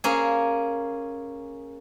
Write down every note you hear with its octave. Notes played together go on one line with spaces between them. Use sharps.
A#3 C#4 G#4